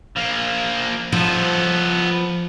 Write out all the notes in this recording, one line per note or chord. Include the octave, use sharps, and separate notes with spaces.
F3 A#3
F3 B3 A4